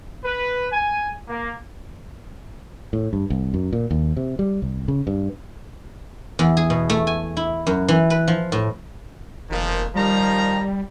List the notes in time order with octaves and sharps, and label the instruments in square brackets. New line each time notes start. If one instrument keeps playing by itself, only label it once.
[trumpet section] B4
G#5
A#3
[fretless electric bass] A2
G2
C2
F#2
A#2
D#2
C3
G3
C2
C#3
G2
[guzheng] E2
G#4
B2
A3
G#5
E4
F#2
E3
B4
F3
A2
[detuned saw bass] F1 [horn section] A#2 D#3 F3
[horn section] D#3 F3 A#5 [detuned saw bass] G3